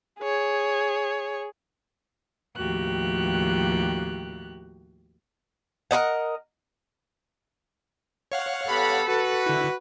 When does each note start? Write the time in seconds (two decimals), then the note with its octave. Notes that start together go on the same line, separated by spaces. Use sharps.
0.20 G#4 C#5
2.57 D#2 A2 F3 F#4 G4 F#6
5.91 A#4 B4 D#5 F#5
8.32 C#5 F5 F#5
8.69 B3 G4 A4 B5
9.07 F#4 B4
9.46 D3 E4